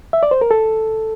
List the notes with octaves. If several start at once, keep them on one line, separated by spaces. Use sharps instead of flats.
E5
D5
C5
A#4
A4